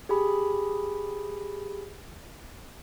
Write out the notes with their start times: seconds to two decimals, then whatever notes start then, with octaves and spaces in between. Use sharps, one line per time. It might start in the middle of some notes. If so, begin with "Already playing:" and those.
0.09 G4 G#4 B5